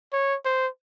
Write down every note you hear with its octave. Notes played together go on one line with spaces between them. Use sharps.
C#5
C5